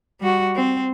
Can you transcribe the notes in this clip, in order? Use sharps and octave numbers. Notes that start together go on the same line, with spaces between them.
G3 F#4
C4